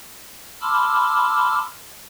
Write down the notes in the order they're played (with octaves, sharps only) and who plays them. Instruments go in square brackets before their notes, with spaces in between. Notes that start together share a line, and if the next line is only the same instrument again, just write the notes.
[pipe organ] A5 B5 C6 D6 E6 F6